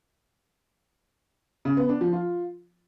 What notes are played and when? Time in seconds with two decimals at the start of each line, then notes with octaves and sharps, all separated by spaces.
1.65 C#3
1.77 B3
1.89 D4
2.01 F3
2.13 F4